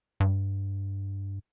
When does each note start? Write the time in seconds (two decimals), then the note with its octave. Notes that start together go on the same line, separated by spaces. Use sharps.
0.20 G2